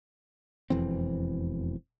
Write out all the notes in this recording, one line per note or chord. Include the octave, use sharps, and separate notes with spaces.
E1 F2 E3 C4